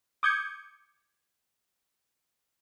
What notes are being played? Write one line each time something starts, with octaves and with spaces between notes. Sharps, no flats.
D6 D#6 G6 G#6 C#7